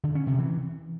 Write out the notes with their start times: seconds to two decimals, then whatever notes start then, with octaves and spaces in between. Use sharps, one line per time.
0.04 D3
0.15 C#4
0.27 C3
0.39 E3